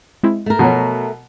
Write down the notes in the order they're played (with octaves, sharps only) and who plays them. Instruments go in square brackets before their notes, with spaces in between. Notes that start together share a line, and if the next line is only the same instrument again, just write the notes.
[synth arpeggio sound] G#3 C4 E4
[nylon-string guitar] A3 A#4
[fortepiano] B2 F#3 [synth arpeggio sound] F3